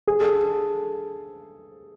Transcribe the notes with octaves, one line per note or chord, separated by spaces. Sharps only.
G#4
A4